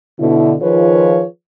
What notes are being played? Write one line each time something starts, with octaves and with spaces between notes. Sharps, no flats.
B2 D3 E4
D#3 F3 F4 G#4 B4 C#5